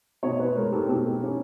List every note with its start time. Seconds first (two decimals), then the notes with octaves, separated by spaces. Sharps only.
0.23 B2 C#5 D#5
0.39 B4 C#5
0.56 G#3 A#4 C5
0.72 G4 A4
0.88 B2 G4 A4
1.23 C#4